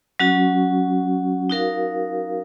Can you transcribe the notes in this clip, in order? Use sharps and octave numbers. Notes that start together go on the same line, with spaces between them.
F#3 C#4 F#4
D#4 F#4 A#4 F5